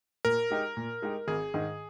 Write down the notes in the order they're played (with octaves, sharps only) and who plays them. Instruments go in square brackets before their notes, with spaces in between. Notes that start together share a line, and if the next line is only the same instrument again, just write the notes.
[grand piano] A#2 [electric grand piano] A#4
[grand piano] G#3 D#4 G4
A#2
G#3 D#4 G4
[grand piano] G#1 [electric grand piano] G#4
[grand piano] G#2 D#3